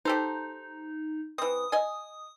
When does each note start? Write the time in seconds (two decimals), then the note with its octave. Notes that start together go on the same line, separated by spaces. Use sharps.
0.05 D#4 G4 A4 C5
1.38 E3 C4 D#6
1.72 D#5 G#5